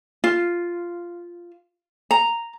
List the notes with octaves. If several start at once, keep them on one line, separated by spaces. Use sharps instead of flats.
F4
A#5